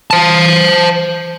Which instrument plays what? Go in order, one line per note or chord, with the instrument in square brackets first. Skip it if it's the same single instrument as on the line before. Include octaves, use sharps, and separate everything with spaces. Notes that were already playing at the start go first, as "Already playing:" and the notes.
[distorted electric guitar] C5 A5